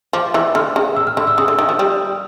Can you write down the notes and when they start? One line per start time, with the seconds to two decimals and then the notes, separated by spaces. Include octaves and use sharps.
0.13 F3 D6
0.34 E3
0.55 D3 F6
0.76 C#3
0.96 E6
1.07 F6
1.17 D3 E6
1.27 E6
1.38 C#3 D#6
1.48 D3
1.59 D#3
1.69 F3
1.79 G3